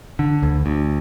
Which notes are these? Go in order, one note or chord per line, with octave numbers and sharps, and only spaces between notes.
D3
D2
D2